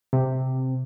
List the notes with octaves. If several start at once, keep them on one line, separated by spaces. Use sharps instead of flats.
C3